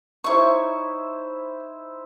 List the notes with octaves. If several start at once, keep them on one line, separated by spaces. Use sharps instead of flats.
D#4 E4 C5 C#5 C#6